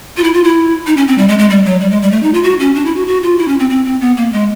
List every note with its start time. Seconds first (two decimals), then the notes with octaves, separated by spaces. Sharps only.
0.17 F4
0.24 E4
0.34 F4
0.44 E4
0.87 D#4
0.97 C#4
1.08 C4
1.18 G3
1.28 G#3
1.39 G#3
1.50 G3
1.66 F#3
1.81 G3
1.91 G#3
2.02 G3
2.12 A3
2.23 D#4
2.34 F4
2.43 F#4
2.60 C#4
2.75 D4
2.85 E4
2.96 F#4
3.07 F#4
3.23 F4
3.38 E4
3.48 C#4
3.59 C4
3.70 C4
3.85 C4
4.01 B3
4.17 A#3
4.33 G#3